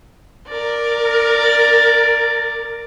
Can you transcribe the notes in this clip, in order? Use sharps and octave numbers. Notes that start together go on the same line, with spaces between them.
A#4 D5